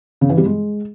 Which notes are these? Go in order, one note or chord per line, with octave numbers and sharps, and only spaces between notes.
C#3
E3
G3
G#3